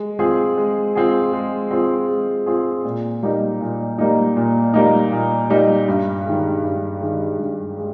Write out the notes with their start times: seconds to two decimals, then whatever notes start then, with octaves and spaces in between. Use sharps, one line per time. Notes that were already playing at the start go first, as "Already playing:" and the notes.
Already playing: G#3
0.19 C4 F4 G#4
0.57 G#3
0.95 C4 F4 G#4
1.33 G#3
1.71 C4 F4 G#4
2.09 G#3
2.46 C4 F4 G#4
2.84 A#2
3.23 G3 A#3 D#4
3.61 A#2
3.98 G3 A#3 D#4
4.36 A#2
4.74 G3 A#3 D#4
5.12 A#2
5.50 G3 A#3 D#4
5.88 G2
6.25 D#3 G#3
6.64 G2
7.01 D#3 G#3
7.39 G2
7.77 G#3